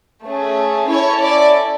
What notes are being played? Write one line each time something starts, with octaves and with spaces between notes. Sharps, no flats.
A3 C#4 G#4
C#4 E4 A4 C#5
D5